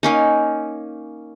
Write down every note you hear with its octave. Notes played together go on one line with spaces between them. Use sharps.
A#3 C#4 D#4